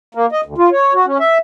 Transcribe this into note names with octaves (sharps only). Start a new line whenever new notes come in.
A#3
D#5
D2
F4
C#5
F#4
C#4
E5